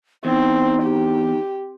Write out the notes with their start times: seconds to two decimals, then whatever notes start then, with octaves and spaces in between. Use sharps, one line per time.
0.25 E2 C4 D#4
0.82 G4